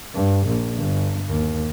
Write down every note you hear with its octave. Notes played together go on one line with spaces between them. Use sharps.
G2
A#1
G1
D#2